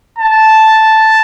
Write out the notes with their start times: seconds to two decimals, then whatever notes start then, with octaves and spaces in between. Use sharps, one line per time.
0.19 A5